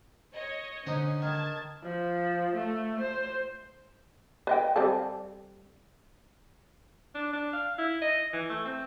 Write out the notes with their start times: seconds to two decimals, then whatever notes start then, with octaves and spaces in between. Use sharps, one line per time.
0.33 C#5 D#5
0.87 D3 C#4 D#4 C5
1.22 D#3 A5 G#6
1.83 F3
2.56 A3
3.00 C5
4.47 B4 D#5 G5
4.76 G3 C4 A4
7.15 D4
7.33 D4
7.53 F5
7.78 E4
8.02 D#5
8.33 E3
8.49 A3
8.65 C4